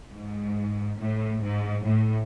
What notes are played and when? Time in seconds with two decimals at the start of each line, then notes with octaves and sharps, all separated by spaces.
0.11 G#2
1.00 A2
1.43 G#2
1.86 A2